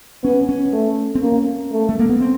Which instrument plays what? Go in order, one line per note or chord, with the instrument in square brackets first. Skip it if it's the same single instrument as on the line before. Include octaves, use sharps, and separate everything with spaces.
[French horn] B3 [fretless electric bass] C#4
[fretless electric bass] C#4
[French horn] A3
[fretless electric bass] C4
[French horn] A#3 [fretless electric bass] C#4
[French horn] A3
[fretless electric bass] A3
A#3
B3
C4